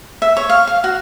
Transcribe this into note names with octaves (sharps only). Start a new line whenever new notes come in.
E5
C#5
F5
F5
F#4